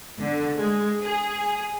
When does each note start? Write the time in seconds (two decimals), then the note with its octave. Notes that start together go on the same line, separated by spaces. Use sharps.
0.20 D3
0.56 G#3
1.03 G#4